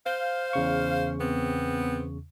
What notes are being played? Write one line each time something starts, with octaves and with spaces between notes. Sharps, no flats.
C5 F5 G6
E2 C#3 C#6
B3 C4